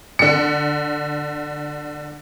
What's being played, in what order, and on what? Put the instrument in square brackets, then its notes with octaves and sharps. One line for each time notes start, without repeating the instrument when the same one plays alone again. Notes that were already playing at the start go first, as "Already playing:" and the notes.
[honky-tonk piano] D3 C#7